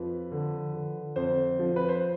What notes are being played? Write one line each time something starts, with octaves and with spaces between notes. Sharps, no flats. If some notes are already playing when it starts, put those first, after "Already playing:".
Already playing: F2 F3 B4
D3
D3
F2 C5
F3
B4
C5